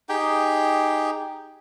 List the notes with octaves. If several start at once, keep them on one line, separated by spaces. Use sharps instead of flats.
D#4 G4 G#4 G5